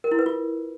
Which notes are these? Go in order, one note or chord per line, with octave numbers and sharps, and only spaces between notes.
A#4
E4
B4
F4